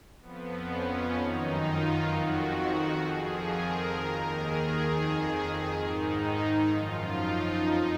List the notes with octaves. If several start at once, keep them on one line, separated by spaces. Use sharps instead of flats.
F2 F3 B3
C#4
F#2 D#3 D#4
F4
F2 D#3 F#4
F#4
F2 F3 G#4
A#4
D#2 D#3
G#4
F2 D#3
G#2 D#3 D#4
F#2 F3 F4
D#4
F2 F3